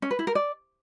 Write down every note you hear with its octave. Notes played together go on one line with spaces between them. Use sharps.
C#4
B4
E4
A#4
D5